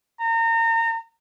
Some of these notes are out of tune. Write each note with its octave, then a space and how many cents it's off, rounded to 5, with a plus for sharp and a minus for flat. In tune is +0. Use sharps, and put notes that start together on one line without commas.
A#5 -30